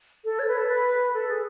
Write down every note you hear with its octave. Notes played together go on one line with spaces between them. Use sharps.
A4
C#5
B4
A4
B4
A4
G#4